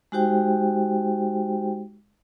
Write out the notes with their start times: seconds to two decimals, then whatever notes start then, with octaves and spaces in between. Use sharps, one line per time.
0.12 G#3 D#4 F#4 G4 C5 G5